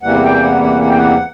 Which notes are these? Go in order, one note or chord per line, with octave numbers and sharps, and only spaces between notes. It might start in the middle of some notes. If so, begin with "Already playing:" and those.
E2 C3 E3 G3 A#3 F#5
G5
F#5
F#5
F#5
G5
F#5